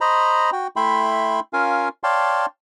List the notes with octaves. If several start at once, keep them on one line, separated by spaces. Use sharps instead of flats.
C5 D#5 A#5 B5
F#4 G5
A3 E4 E5 G5 B5 C6
C#4 F4 A#4 F5 G#5
C#5 D5 F5 G5 A5 C6